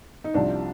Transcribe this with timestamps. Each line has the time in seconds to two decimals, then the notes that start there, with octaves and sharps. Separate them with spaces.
0.24 D#4
0.34 C2 C3 F3 D4